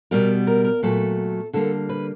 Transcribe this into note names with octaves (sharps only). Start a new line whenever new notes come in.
B2 G3 B3 A#4
A#4
A#4
A#2 F#3 A3 A4
D3 G3 A#3 A4
B4